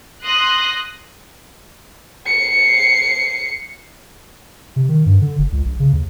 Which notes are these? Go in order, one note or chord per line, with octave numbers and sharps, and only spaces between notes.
C6 D#6 F#6 A#6
C7 C#7
C3
D#3
G2
D3
F#1
C#2
A#1
C#3
D#2